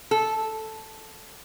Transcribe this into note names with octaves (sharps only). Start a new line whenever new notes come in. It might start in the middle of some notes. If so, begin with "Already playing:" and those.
A4